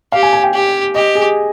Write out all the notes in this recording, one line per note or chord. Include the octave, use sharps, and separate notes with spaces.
G4 F5
G#5
G#5
G5
G4
G4 D#5
G#4